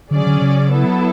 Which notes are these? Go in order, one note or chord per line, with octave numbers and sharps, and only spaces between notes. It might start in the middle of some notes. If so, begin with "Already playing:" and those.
D3 F#3 C#4 G#4 D5
D3
C#3
F#3 B3 E4 A4